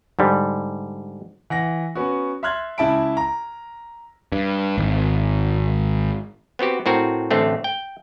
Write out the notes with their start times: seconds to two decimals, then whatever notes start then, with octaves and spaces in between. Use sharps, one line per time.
0.19 G#2 D3 G3
1.50 E3 F#5 A#6
1.95 B3 C#4 F#4
2.43 E5 C6 F6 F#6 G#6 A6
2.78 C#2 E4 E5 A5 B5 D7
3.17 A#5
4.32 G2
4.78 G#1
6.59 B3 C4 F#4 G4
6.86 A2 C4 F#4 A#4
7.31 A1 D3 A3 C4
7.64 G5